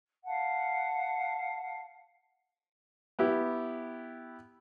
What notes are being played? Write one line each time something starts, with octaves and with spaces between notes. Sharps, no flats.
F5 F#5 A5
B3 E4 G4